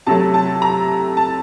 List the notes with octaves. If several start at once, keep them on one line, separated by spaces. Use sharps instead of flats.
C3 F#3 A3 A5
A5
A#5
A5